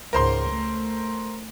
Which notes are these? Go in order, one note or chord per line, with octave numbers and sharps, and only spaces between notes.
C#2 G#2 A#4 C5 C6
A3